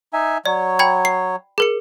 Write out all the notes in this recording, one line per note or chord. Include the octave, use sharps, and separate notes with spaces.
D#4 E5 G#5
F#3 C#5 D5
G5 B5 G#6
C7
G#4 A#4 C#7